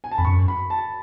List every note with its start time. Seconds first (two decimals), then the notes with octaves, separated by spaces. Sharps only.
0.04 G#5
0.11 A5
0.18 F2 B5
0.25 F#2 C#6
0.48 B5
0.70 A5